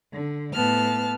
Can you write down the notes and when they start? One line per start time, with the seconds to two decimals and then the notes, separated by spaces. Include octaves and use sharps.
0.14 D3
0.54 A2 B3 A5 F6